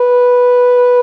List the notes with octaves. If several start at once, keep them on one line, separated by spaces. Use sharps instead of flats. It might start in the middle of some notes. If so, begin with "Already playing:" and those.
Already playing: B4